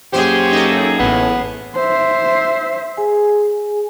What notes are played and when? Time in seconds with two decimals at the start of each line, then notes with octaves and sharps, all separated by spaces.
0.13 F#2 A#3 G4 G#4 C5
0.52 D#4 A4
0.99 A1 A2 B3
1.76 C5 E5
2.97 G#4 G#5